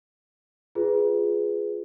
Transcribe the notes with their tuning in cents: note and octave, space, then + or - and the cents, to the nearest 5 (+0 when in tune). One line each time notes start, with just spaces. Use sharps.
F4 +0 G#4 +0 B4 +10